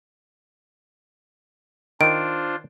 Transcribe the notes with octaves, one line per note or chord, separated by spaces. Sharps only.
D#3 D4 F4 C5 D7